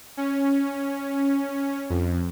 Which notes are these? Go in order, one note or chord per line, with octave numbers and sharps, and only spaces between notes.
C#4
F2